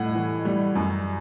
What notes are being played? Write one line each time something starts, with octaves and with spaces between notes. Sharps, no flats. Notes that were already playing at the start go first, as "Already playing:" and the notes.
Already playing: A2 G3 F#5
E3
G3
F#2